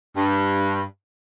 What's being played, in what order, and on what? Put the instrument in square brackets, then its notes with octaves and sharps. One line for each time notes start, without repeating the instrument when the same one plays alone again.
[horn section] G2